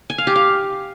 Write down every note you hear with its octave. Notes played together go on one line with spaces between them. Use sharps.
G#5
F5
G4
F5